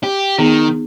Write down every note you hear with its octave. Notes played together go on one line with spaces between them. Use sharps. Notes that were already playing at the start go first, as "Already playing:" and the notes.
G4
D#3 B3 D#4 G#4